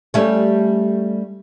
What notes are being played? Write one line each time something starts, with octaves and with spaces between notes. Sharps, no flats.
G3 A3 C#4